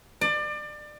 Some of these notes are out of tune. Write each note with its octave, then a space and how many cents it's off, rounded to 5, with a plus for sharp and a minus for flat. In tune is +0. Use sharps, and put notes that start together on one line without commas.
D5 +30